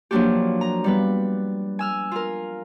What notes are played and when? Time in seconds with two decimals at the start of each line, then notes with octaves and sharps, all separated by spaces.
0.11 F3 F#3 A#3 D4 F#4 G4
0.61 A#5
0.84 G3 B3 B4
1.79 G#5 E6 F6
2.12 F4 A#4